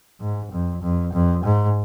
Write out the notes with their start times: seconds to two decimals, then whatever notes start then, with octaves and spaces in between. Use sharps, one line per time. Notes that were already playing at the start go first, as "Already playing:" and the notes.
0.20 G#2
0.52 F2
0.82 F2
1.13 F2
1.44 G#2